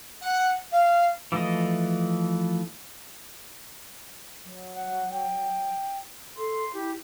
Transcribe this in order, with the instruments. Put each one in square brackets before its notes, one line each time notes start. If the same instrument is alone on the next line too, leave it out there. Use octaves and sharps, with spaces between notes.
[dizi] F#5
F5
[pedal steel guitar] E3 F3 A3 D#5
[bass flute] F#3
[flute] F#5
G5
[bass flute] A4 [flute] C6
[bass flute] E4 [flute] G4